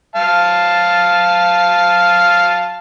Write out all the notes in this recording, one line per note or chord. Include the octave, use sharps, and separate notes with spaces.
F5 A5